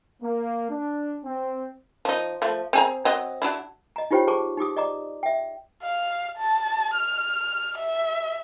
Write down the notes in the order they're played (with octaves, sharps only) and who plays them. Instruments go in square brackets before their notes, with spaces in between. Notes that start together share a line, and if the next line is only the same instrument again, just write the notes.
[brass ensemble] A#3
D4
C4
[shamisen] F3 D#4
F3 A3
C4 G#4 A#5
F#3 C4 D#5
F#3 D4 E4
[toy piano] D#5 A#5
D#4 F4 G4 C5 C#5 G5
G#4 C5 A5 C#6 D6
D#4 G4 D6 D#6
D5 D#5 A#5 D6
E5 G5
[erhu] F5
A5
F6
E5